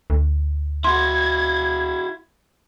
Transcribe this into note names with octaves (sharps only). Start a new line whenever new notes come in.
D2
E4 F#4 C6 G#6